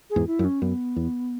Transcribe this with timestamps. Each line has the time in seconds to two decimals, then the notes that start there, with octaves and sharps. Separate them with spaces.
0.10 G#4
0.16 E2 G#2
0.27 E4
0.39 F#2
0.45 C#4
0.62 F#2 B3
0.96 E2